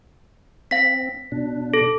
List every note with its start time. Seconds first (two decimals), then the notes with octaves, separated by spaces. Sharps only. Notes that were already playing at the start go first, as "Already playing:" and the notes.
0.71 C4 F5 B6
1.32 B2 D4
1.74 A4